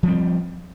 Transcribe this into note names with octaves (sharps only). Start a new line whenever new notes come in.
F3 G3 C4